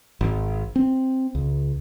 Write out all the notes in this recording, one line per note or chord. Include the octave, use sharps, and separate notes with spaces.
G#1
C4
C#2